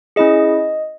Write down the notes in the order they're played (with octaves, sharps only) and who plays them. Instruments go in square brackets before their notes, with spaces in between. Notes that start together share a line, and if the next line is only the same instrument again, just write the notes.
[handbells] C#4 E4 G#4 D#5